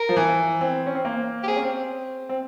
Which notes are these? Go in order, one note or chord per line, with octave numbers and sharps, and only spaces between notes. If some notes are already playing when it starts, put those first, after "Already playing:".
Already playing: A#4
F3
E3
C4
C#4
C4
A#3
G4
C4 G#4
C#4
C4
C4